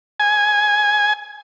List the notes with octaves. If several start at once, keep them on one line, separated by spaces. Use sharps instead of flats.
G#5